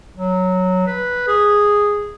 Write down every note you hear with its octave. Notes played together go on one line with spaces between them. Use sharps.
F#3
B4
G#4